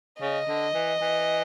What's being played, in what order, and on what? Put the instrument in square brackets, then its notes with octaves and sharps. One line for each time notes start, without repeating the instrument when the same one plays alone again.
[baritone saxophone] C#3 [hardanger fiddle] D#5
[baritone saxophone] D3
E3
E3